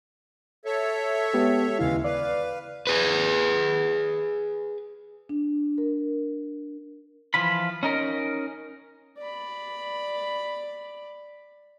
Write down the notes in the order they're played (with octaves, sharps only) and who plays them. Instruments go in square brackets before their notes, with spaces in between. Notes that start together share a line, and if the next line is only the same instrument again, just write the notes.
[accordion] A4 C#5 E5
[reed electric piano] G#3 B3 G4
[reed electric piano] D#2 C#3 E4 [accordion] E3 G#3 F5
[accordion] B4 F5 [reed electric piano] D5
[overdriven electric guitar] G#4 B4
[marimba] D4
A#4
[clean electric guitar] E3 F3 F4 B5
C#4 D#4 A#4
[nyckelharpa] D5 B5